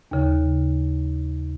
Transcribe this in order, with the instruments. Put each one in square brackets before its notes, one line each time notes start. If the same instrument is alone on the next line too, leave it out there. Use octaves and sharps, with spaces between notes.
[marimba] D#2 C#3